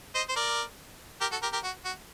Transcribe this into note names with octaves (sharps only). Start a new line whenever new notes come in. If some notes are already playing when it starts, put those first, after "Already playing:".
C5 D#5
C5
A#4 D5
G4 A#4
F#4 A4
G4 A#4
G4 A#4
F#4
F#4